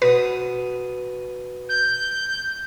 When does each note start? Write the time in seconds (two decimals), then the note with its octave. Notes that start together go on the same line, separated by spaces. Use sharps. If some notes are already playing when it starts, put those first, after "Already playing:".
0.02 B2 B4 D#6
1.69 G6